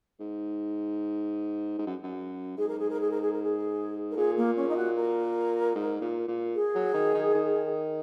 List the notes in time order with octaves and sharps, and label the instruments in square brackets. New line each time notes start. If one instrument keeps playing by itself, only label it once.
[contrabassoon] G#2
G#2
F#2
F#2
[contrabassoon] G#2 [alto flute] G#4
[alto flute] A#4
G#4
A#4
G#4
A#4
G#4
A#4
G#4
A#4
[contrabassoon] A#2 [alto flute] G#4
[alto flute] A#3
C#4
D#4
F#4
A#4
[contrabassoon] G#2
A#2
A#2
[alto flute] G#4
[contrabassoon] F#3
D#3
D#3
D#3